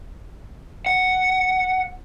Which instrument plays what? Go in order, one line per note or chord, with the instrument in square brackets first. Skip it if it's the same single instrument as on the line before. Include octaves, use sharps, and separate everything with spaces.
[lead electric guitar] F#5